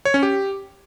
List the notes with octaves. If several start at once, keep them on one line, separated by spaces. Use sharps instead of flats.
C#5
C#4
G4